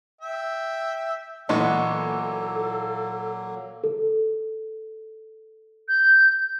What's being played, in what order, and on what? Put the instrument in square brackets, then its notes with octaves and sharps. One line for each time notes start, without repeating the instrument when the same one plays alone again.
[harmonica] E5 G5
[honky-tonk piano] A#2 E3 [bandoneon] F#3 A#3 [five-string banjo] G#3 B3 F#4 [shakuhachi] A4
[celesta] A4
[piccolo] G6